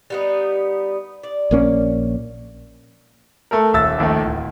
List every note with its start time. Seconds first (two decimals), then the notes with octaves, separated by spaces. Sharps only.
0.10 G3 B3 D#4
1.23 D5
1.51 A#1 A#3 C#4
3.51 A3 A4 A#4
3.73 D#1 E5 E6 A6
3.98 A#1 D#2 D#3 A3
4.24 D1